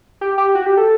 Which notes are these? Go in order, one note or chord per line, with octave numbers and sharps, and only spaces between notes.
G4
G4
F#4
G4
A4